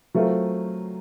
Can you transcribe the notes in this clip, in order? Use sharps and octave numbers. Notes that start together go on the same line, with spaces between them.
F#3 A3 C4 F4 A#4